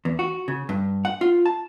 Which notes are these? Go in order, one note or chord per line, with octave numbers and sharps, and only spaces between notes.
E2
F#4
C#3
G2
F#5
F4
A5